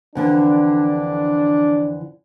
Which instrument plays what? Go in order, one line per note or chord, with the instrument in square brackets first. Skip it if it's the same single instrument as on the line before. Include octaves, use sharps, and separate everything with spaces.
[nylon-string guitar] F2 D3 E3 [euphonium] D4